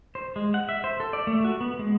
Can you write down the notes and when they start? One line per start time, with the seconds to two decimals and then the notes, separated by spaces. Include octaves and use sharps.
0.15 C5
0.36 G#3
0.54 F#5
0.69 E5
0.84 C5
1.00 A4
1.13 D5
1.27 A3
1.45 F#4
1.61 B3
1.79 G#3